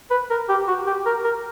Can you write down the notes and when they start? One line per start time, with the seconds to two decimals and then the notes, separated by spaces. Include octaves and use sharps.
0.11 B4
0.30 A#4
0.49 G4
0.68 F#4
0.87 G4
1.06 A#4
1.24 A#4